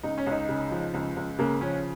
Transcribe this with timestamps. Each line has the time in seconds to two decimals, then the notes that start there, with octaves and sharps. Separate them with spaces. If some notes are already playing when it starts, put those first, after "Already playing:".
0.03 C#2 D#4
0.18 C#4
0.26 C#2 D#4
0.49 C#3
0.71 F3
0.94 C#2
1.16 C#2
1.39 C#3 A#3
1.61 F3 C#4